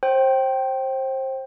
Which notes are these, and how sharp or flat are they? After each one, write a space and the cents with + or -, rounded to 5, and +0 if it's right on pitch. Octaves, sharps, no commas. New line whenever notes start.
C5 +25 G5 -15